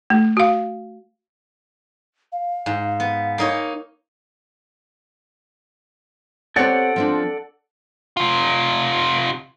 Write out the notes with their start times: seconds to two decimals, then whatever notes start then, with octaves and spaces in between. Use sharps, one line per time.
0.10 A3
0.37 F#4 F5
2.32 F5
2.66 G#2
3.00 B3
3.38 A#3 D#4 C#5
6.56 C4 G4 A4 C#5 D5 F#5
6.96 F3 C4 D4
8.17 C3 F4